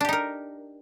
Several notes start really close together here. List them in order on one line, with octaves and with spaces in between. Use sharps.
D4 G4 D#4 A#4